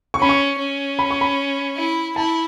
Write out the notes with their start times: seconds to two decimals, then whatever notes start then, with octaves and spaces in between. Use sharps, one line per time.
0.14 C#6
0.20 C#4 B5
0.29 C#6
0.59 C#4
0.99 B5
1.10 C#6
1.21 B5
1.77 E4
2.16 E4 A5